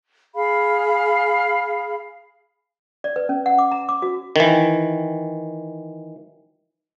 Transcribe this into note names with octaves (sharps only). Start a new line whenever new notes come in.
G#4 F5 B5
D5
B4
C#4
F#5
D6
A#5
D6
F#4
D#3 E3